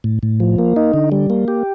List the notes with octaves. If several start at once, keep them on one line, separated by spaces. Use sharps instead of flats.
A2
A2
F3
A#3
D#4
D3
G3
A#3
G4